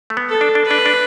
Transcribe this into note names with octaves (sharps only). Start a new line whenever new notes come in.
A3
B3
A4
D4
D4
B4
D4
D4